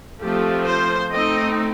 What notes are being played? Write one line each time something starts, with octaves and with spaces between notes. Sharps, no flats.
F3 A3 C4 F4 G4
C5
A3 C4 D#4 D#5